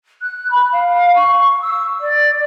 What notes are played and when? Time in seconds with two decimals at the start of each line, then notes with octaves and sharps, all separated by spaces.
0.22 F#6
0.50 B5
0.72 F5
1.15 C#6
1.62 E6
2.00 D5